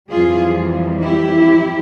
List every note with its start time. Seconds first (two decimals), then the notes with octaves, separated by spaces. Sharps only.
0.11 F2 E3 G3 F4 G#4
1.03 E4 G4